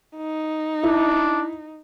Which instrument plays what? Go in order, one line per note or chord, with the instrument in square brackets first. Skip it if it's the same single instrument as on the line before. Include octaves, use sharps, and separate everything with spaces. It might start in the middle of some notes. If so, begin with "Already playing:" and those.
[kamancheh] D#4
[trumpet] D4 [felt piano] E4